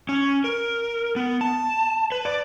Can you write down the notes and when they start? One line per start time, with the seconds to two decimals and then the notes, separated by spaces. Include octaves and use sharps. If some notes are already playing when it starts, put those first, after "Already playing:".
0.09 C#4
0.44 A#4
1.16 B3
1.41 A5
2.12 B4
2.25 D5